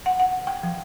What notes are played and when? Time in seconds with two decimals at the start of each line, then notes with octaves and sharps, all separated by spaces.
0.06 F#5
0.20 F#5
0.47 G5
0.63 F3